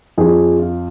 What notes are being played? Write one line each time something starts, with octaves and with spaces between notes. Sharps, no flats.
F2 F3 G#4
F4